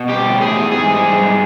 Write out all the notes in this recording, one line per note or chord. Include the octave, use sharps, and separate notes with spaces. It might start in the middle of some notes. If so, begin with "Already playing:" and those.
Already playing: B2
G3 G4
A2
G#4
E3
G#2 G#4
G3
G#2